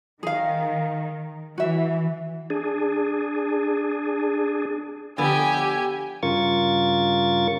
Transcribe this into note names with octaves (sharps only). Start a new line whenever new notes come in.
D#3 G#4 F5
E3 F#4 E5
D4 G#4
D3 F3 B3 G4 G#5
G2 C#3 F4 A#4 C#6 A6